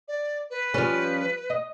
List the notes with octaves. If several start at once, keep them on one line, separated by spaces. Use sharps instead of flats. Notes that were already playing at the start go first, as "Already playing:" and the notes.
D5
B4
F3 G3 C#4
D#5